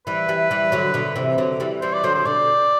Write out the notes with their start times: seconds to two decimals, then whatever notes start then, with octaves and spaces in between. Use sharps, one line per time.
0.07 E3 G3 B4
0.29 E3 G3
0.51 E3 G3
0.72 D3 F#3
0.94 B2 D3
1.16 C3 E3
1.38 D3 F#3
1.60 E3 G3
1.82 E3 G3 C5
1.93 D5
2.04 D3 F#3 C5
2.15 C5
2.25 B2 D3 D5